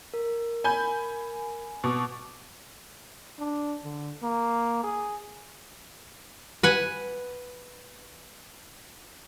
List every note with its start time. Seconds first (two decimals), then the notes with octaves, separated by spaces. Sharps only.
0.14 A#4
0.64 G#5 B5 G6
1.84 B2 C#6 D6
3.39 D4
3.84 D3
4.22 A#3
4.84 G#4
6.63 B4 F#5 G#5